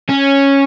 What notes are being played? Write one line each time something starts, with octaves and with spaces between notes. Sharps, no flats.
C#4